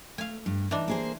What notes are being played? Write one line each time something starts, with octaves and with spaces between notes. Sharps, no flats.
A3 F5 G#5
G2
E3 D4 D#4
A#3 G#4 C5